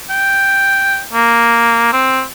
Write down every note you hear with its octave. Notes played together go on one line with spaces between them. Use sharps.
G5
A#3
C4